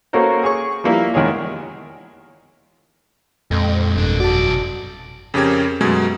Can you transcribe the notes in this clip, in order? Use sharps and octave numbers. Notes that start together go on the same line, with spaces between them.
A#3 C#4 F#4 A4 A#4 C5
G#4 C#5 C#6
F3 G3 A#3 E4
E2 D#3 G#3 G#4 C#5
F2 A#2 G#3
G1 G2 B2 D4
B1 F#4 D5 A5
F2 C#3 C#4 G4 A#4 G#6
F#2 B2 F#3 G#3 A3 G#6